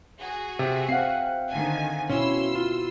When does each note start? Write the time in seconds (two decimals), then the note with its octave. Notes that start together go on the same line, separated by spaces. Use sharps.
0.19 F#4 G#4
0.59 C3 E5
0.89 C4 F5 F#5 C7
1.51 D3 D#3 G#5
2.09 B2 C#4 E4 C6 E6
2.55 F4